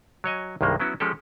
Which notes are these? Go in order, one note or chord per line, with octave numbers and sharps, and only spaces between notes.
F#3 C#5 D#5 G#5
C2 G2 D#3 G#3 A#3
F#3 B3 C#4 E4 F#4
F3 G#3 C#4 G4 A4